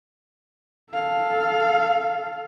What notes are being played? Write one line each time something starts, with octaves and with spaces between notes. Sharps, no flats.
A4 F5